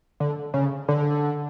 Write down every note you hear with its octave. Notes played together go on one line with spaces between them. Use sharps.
D3
C#3
D3